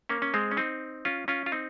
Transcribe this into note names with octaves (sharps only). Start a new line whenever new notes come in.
A#3 C#4
C#4
G#3 C4
C#4
C4 D#4
C#4 F4
C#4 F4
F4
C4 D#4